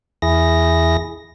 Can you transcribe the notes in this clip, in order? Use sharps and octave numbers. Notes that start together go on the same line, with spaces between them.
E2 E4 G#4 A#6